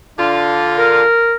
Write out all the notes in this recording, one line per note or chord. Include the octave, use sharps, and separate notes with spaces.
D3 D4 F4
A#4